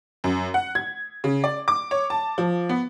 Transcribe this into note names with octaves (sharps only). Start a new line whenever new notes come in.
F#2
F#5
G#6
C#3
D5
D6
C#5
A5
F3
B3